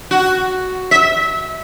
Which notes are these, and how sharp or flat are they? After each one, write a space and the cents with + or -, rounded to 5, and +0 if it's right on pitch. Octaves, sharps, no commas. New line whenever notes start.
F#4 +5
E5 -25